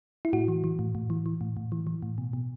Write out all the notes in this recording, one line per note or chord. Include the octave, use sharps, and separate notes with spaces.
E4
A2 F#4
E3
E3
A2
A2
E3
E3
A2
A2
E3
E3
A2
B2
B2